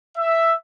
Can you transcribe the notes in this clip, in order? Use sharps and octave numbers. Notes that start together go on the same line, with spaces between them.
E5